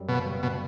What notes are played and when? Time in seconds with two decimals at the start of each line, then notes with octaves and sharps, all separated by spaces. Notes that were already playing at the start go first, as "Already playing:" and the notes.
Already playing: F#2 G3
0.08 F#1 B2
0.25 G3
0.43 B2